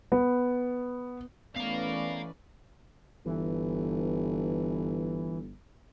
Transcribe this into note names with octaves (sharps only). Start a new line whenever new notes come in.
B3
E3 A3 B3 C#4 B4 D5 F5 A#5
G1 E3